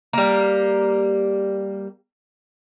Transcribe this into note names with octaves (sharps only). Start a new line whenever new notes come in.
G3 A#3